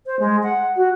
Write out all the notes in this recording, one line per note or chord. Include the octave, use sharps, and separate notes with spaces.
C5
G#3
F#5
F#4